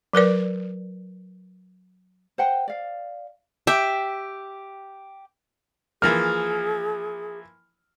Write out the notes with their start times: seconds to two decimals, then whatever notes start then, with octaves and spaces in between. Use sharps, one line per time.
0.13 F#3 A#4 B4 D5
2.38 C5 F#5 G5
2.68 D5 F5
3.67 G4 E5 G5
6.02 E3 F3 A#3 G#4 F6